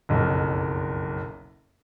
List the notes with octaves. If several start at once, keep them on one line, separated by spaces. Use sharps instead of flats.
F#1 B1 F2